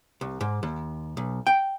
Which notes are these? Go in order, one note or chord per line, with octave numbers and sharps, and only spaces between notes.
C2
G#2
D#2
B1
G5